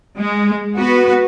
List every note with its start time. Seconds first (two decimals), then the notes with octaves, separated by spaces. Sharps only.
0.17 G#3
0.76 B3 F#4 B4